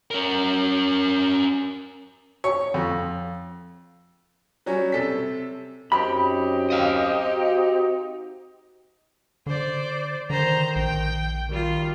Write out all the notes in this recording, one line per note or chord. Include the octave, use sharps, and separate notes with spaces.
C#4 A#4
C#5
F2
F#3 G3 C#4
C3 A4 B6
F#2 C4 D#4 G4 B5
D#5 F5
F#4
D3 C5 D5
D3 D#3 C5 A#5
A#1 G5
D#3 G3 F4